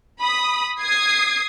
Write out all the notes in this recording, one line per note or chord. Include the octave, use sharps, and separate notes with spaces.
B5 D#6
D#6 G#6 C7